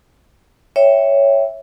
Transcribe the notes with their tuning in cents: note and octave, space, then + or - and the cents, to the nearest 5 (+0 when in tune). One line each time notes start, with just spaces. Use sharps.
C#5 +0 E5 +0 G5 +0